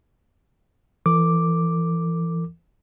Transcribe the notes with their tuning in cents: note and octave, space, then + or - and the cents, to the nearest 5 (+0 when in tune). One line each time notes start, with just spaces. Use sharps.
E3 +20 A4 +45 D6 +0